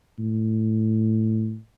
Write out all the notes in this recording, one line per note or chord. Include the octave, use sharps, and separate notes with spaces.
A2